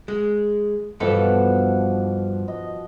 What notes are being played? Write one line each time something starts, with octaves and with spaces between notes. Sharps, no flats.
G#3
G2 B2 E3 F3 A4 F#5
D#5